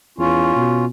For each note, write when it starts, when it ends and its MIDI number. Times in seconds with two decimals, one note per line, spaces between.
0.18 0.54 40
0.18 0.85 61
0.18 0.85 65
0.56 0.88 47